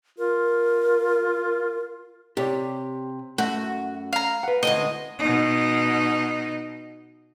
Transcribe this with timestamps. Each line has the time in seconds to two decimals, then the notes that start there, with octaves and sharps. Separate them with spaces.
0.18 F4 A#4
2.37 C3 G4 C#5 D5
3.38 F#2 A3 F#4
4.13 F5 A#5
4.43 B4 F#5
4.63 D2 G#3 C4 D#5
5.19 B2 D#4